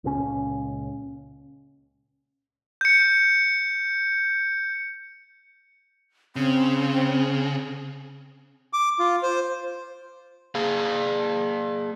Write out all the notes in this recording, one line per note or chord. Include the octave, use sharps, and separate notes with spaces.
C#2 A#2 F3 C#4
G6 C#7
C#3 C4
D6
F4
C5
A#3 G#4 F5